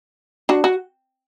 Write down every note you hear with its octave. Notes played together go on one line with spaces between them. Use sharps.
D4 F#4
F#4